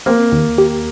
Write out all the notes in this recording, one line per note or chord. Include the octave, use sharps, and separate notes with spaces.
A#3 C4
D#2
G4